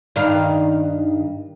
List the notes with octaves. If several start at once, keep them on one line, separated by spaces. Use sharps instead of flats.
G2 D#3 F5